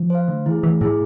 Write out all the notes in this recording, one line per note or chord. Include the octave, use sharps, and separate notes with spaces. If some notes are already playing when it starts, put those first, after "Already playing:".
Already playing: F3
C5 F5
D3 A3
E3 E4 G#4
E3 A3
A2 E4 G#4